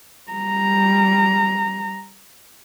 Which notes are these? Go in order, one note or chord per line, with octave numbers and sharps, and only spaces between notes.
G3 A#5